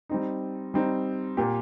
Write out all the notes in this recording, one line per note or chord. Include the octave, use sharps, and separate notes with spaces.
G3 C4 D#4
G3 C4 D#4
A#2 A#3 G4